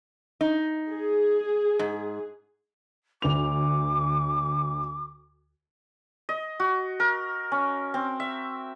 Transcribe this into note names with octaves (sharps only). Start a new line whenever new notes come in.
D#4
G#4
G#2
D2 D6 F7
D#5
F#4
A#4
C#4
C4
E5